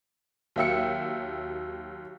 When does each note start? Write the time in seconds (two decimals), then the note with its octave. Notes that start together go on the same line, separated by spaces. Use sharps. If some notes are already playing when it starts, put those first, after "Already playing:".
0.56 D#2 F#3 E5 G5 E6 C#7